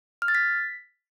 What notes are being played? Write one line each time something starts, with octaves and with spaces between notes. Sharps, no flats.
F6
A6
B6